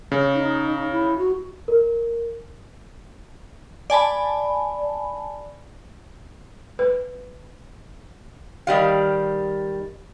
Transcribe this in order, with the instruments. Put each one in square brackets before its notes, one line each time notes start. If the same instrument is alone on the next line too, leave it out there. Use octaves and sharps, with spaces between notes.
[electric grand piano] C#3
[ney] D#4
E4
F#4
[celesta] A#4
[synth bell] D5 G#5 A5 B5
[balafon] B4
[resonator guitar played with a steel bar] D#3 G3 F5